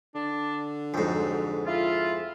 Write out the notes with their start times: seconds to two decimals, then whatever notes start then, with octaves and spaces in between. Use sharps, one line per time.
0.15 D3 D4
0.94 F2 G#2 F#3
1.67 E4 F4